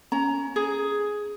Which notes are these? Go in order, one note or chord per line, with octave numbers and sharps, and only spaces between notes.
C#4 A#5
G#4